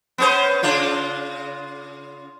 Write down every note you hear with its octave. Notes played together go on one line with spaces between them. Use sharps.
B3 C#4 C5
C#3 D4 F4